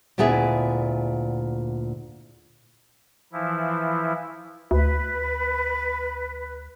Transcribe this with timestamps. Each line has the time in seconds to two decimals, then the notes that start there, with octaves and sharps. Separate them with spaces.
0.18 D2 A#2 B3 E4 G#4 E5
3.33 E3 F3 E4
4.71 D2 B4